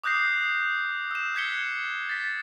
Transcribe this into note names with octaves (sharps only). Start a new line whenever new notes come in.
D6 D#6 F#6 G6 A#6 C7
E6 E7
F#6 G#6 B6 C#7 G7
A6 B6